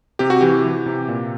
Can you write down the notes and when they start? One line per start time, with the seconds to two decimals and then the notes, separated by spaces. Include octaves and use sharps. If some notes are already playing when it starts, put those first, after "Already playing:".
0.19 C3 G4
0.30 F#4
0.41 E3 G4
0.64 E3
0.86 C3
1.08 A#2